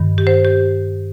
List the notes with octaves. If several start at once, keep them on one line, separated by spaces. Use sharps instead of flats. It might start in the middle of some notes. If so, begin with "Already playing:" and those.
Already playing: G2 D#3
G4
C5
G4